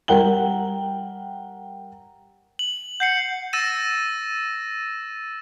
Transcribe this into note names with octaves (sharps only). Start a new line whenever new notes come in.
G3 A#4 F#5 G5 G7
F#7
F#5 G6 C7 C#7
E6 A6 A#6 D#7 E7